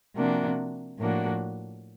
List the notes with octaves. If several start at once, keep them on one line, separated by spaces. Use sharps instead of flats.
C3 F3 A#3 D4 F#4
A2 F3 A#3 D4 F#4